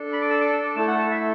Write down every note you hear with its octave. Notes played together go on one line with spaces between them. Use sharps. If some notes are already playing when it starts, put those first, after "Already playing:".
Already playing: D4 A4
B5
D6
E6
D6
E6
D6
A3 E4 A4 A5
F#5
A5
E5